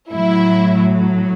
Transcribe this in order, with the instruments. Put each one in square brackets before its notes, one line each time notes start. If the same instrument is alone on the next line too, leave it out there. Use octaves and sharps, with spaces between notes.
[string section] A2 F#3 E4